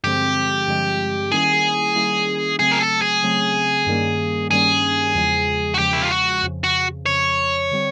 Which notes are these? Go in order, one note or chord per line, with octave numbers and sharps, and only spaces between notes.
G2 D3 F3 G#3 C4 G4
G2 D3 F3 G#3 C4
D#3 G3 A#3 C#4 E4 G#4
D#3 G3 A#3 C#4 E4
C#3 F#3 A3 C4 G#4
A#4
A4
G#4
C#3 F#3 A3 C4
G2 D#3 G3 A#3 C#4
G2 D#3 G3 A#3 C#4 G#4
E2 C#3 F3 G#3
F#4
E2 C#3 F3 G#3 G4
E4
F4
F#4
F2 C#3 F3
F#4
F2 C#3 F3 C#5
D3 G3 C4